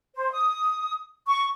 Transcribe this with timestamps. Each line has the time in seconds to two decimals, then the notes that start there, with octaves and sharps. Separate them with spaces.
0.14 C5
0.32 D#6
1.27 C#6